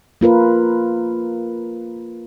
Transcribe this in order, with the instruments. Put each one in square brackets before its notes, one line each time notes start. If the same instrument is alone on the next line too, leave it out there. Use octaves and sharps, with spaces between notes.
[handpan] A#3 F4 A#4 B4